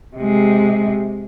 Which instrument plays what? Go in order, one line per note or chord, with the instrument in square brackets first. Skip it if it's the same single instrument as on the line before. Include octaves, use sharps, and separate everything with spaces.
[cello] C3 G#3